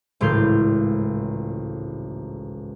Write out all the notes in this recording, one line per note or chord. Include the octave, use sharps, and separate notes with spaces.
G#1 C#2 A2 E3 F5 G6